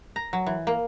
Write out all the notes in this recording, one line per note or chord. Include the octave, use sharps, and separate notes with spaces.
A#5
F#3
E3
A#3